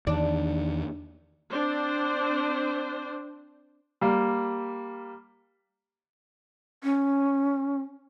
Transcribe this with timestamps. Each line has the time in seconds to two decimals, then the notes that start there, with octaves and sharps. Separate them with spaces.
0.07 E2 D#3 D4
1.50 C4 D4 C5
4.01 G3 A#3
6.84 C#4